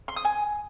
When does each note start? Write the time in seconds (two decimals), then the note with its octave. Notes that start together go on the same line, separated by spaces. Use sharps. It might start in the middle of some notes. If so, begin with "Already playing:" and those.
0.08 C6
0.16 D#6
0.25 G#5